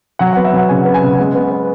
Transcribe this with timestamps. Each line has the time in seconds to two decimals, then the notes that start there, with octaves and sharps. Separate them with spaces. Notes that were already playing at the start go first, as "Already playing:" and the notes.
0.19 F#3 F#5
0.33 B3 F#5
0.44 E5
0.53 F#3 F#5
0.69 C#3 G#5
0.85 B3
0.94 G#5
1.03 C#3
1.19 G#3 F#5
1.35 B3
1.51 B3